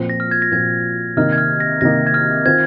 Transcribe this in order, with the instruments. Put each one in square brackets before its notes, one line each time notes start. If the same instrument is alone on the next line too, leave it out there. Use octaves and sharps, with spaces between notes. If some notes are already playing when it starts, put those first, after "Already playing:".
Already playing: [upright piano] A#2 F3 C4
[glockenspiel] A#6
F6
G#6
A#6
[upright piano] A#2 F3 C4 [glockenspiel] G#6
[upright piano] C3 D#3 A#3 D#4 [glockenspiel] F6
[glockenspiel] G#6
F6
A#6
[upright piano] C3 D#3 A#3 D#4 [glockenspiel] A#6
[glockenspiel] G#6
F6
[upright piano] D#3 C4 F4 [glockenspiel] G#6